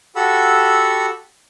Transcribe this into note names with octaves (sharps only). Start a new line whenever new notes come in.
F#4 G4 A4 F#5 B5 E6